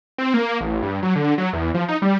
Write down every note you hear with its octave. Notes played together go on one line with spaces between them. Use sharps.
C4
A#3
A1
G2
F#3
D3
F#3
E2
F3
D#4
G3